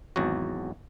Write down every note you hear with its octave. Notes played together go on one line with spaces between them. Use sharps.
G#1 E2 F#3 F#4